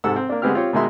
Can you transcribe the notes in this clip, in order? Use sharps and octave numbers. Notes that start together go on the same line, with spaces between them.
G#2 C3 A4 F#5 E6
C4
A#3 D4
D3 G#3 B3 C4 G4 F6
C4 F4 G4 C#5
B2 D#3 G#3 D#4 E5 C6